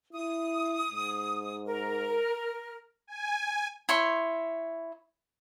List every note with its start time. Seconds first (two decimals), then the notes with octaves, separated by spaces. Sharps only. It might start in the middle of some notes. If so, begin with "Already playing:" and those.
0.13 E4 D#6
0.91 G#2
1.66 A#4
3.07 G#5
3.89 E4 C#5 C6